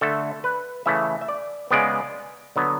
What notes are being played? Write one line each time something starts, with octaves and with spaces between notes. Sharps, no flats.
D3 A3 A4
B4
C#3 E3 A3 E5
E5
D5
C#3 G#3 B3 D5
D3 F#3 B3